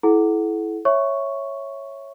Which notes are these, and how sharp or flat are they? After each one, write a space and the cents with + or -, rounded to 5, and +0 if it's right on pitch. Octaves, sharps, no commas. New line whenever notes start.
E4 +0 A4 -40 F#5 +5
C#5 -10 E5 +0 C#6 +0